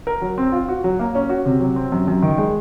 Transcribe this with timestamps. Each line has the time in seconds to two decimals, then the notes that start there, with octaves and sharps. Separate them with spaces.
0.07 A#4
0.22 F#3
0.38 C4
0.52 F4
0.69 F#4
0.84 F#3
0.99 A#3
1.15 C#4
1.29 F#4
1.45 C3
1.60 F#3
1.76 C4
1.92 F#2
2.08 F#2
2.22 D#3
2.38 G#3